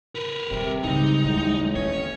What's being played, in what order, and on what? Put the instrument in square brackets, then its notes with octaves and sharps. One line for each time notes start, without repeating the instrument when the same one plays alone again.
[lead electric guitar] A#4 B4
[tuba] C3 [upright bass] D#3 G3
[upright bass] G#2 C#3 [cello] G3 G#3 [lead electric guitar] D#4
[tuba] A1 [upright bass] D#2
[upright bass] D#2 [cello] C#4 [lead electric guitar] C#5